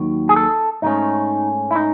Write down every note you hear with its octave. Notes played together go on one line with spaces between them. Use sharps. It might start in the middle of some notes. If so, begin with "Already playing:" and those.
Already playing: D#2 D#3 F#3
G#4
A4
G#2 F#3 A3 C#4 D#4
E4
D#4